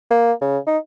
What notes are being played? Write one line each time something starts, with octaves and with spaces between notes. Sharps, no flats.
A#3
C#3
D#4